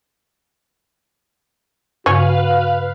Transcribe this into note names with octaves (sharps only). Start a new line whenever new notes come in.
G2 C#3 C#4 F#4 B4 F5